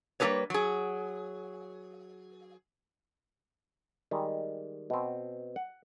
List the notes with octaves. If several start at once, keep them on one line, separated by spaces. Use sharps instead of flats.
G3 A#3 C#4 G#4 B4 C#5
F#3 G#4
D#3 G3 G#3
B2 C4
F#5